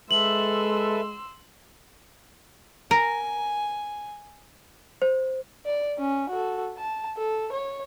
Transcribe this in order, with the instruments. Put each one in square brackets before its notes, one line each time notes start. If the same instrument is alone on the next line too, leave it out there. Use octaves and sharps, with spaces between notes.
[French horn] G#3 [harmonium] A4 B4 E5 [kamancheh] C6 E6 [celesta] F#7
[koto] A#4 [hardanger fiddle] G#5
[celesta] C5
[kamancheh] D5
C#4
F#4 A4
A5
A4
C#5